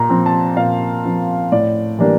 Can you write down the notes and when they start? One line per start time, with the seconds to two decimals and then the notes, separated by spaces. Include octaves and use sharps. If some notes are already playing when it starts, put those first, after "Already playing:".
Already playing: A#2 A#5
0.09 F3 C4
0.26 A5
0.57 A#2 F5
1.05 F3 C4
1.52 A2 D5
1.99 E3 G3 A#3 D4